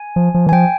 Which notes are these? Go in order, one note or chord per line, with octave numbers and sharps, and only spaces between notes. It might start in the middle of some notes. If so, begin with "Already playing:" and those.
Already playing: G#5
F3
F3
E3 G#5
F3 G5